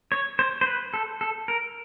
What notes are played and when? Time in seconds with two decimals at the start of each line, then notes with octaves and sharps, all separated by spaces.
0.12 C#5
0.39 C5
0.61 C5
0.66 B4
0.94 A4
1.21 A4
1.48 A#4